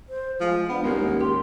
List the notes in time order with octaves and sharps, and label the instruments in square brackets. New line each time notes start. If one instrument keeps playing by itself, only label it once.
[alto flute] C5
[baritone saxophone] F3 [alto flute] G#3
[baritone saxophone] B3 [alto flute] D4
[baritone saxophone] D#2 [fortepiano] G#3 A#3 C#4 [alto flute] A#4
[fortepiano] G4 [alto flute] C6